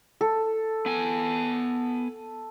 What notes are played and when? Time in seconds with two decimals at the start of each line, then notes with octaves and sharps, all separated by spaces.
0.21 A4
0.86 B3 G#5